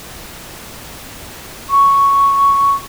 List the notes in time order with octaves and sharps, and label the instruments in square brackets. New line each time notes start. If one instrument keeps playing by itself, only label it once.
[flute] C#6